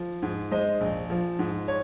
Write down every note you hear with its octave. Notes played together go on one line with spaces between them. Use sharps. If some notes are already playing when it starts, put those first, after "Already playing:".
Already playing: F3
G#2
G#3 C5 D#5
A#1
F3
G#2
C#5